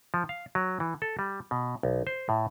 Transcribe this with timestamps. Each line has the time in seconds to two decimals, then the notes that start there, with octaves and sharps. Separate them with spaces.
0.14 F3
0.29 F5
0.55 F#3
0.80 E3
1.02 A4
1.19 G3
1.51 B2
1.83 B1
2.07 C5
2.29 A2